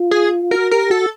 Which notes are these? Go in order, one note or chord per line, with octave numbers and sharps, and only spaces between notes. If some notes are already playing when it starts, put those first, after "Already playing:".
Already playing: F4
G#4
F#4 A#4
G4 A#4
F#4 A4